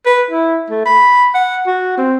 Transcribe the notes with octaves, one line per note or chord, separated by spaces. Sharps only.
B4
E4
A3
B5
F#5
F#4
C4